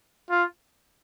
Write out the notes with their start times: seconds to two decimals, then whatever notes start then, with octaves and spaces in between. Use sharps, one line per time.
0.30 F4